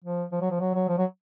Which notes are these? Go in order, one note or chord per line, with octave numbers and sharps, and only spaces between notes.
F3
F3
F#3
F3
F#3
F#3
F3
F#3